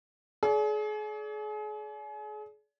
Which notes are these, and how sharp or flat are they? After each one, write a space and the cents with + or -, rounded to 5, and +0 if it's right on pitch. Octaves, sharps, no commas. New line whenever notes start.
G#4 +35 D5 -35